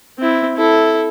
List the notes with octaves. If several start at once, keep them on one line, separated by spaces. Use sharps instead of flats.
C4 E4
E4 A4